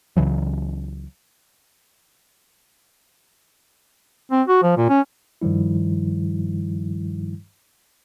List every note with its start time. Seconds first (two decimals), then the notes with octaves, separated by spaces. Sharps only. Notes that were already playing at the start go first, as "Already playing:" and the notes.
0.17 C#2 C#3 E3 F#3
4.31 C4
4.47 F#4
4.63 F3
4.77 A#2
4.89 C#4
5.42 G2 D#3 F3 G3 E4